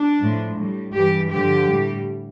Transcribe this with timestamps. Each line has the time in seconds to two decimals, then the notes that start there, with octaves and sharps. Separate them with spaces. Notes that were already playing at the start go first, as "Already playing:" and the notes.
Already playing: D4
0.20 A2 F3
0.57 A2 G3
0.93 G2 E3 G3 G4
1.30 G2 D3 F3 G4
1.67 A2 G3